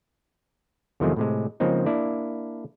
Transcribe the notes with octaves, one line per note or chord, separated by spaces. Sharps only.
E2 C3 D#3 F3 G#3 A3
A2 C3 G#3
C#3 F3 G#3 A#3 C4 D#4
A#3 D4 E4 D5